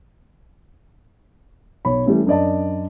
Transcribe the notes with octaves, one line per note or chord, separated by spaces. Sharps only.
B1 C#5 B5
E3 G3 A3 C#4
F#2 D4 D5 D#5 A5